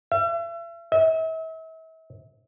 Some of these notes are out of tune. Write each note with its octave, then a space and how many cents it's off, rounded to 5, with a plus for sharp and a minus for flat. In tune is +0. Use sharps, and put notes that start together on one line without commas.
E5 +40
E5 -40